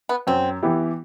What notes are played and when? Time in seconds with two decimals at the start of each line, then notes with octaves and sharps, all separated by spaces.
0.09 B3
0.27 F#2 C4
0.63 E3 B3 E4 G4